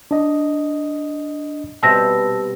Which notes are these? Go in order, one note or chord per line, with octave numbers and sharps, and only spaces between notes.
D4 D#5
B2 G3 C4 A5 E6 A#6